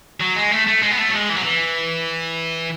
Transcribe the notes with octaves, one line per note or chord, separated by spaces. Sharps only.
F#3
G#3
A3
A3
G#3
B3
A3
F#3
G#3
E3
F#3
E3